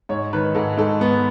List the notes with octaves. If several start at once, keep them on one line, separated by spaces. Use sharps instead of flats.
G#2 C#5
D#3 B4
G#2 A4
G#2 A4
G#2 B3